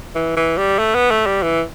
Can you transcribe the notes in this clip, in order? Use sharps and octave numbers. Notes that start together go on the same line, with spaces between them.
E3
E3
G3
A3
B3
A3
G3
E3